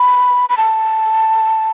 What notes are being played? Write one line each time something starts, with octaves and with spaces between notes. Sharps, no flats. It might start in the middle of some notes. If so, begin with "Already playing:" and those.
Already playing: B5
B5
A5